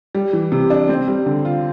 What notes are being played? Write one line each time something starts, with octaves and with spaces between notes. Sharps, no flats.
G3
E3
C3
D4
C4
G3
D3
F4